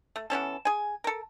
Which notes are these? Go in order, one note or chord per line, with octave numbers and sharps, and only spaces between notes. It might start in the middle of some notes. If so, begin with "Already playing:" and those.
A3
E3 B3 C#4 A4
G#4 G#5
A4 A#4